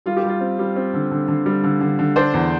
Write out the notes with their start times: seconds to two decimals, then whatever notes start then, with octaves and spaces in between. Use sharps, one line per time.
0.06 G3 F4
0.17 G4
0.24 G3 F4
0.41 C4
0.59 G3
0.76 C4
0.94 D3
1.11 D3
1.28 D3
1.46 G3
1.64 D3
1.81 D3
1.99 D3
2.16 D4 C5
2.34 E2